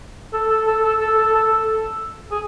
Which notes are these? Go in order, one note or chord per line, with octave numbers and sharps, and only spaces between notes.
A4
A4
A4
A4
A4
A4
A4
A4
G#4